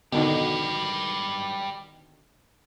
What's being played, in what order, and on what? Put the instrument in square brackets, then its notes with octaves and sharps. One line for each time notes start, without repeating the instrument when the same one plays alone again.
[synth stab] B2 D3 D#3 [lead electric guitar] G4 B4